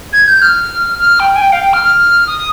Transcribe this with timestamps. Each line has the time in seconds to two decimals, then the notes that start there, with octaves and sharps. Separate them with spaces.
0.13 G#6
0.28 G6
0.42 F6
0.99 F6
1.20 G5
1.36 G#5
1.41 G5
1.53 F5
1.62 G5
1.73 F6
1.84 F6
2.27 D#6